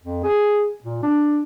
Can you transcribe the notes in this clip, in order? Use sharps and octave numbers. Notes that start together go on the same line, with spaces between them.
F2
G#4
A#2
D4